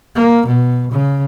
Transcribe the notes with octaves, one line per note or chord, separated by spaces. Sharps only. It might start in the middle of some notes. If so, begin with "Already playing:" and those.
A#3
B2
C#3